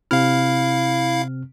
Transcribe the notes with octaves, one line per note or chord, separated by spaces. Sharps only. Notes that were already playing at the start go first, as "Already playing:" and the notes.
C3 C4 E4 F5 F6